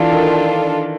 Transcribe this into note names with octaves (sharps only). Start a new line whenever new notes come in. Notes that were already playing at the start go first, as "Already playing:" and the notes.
Already playing: E3 D4 F4 A4
D#3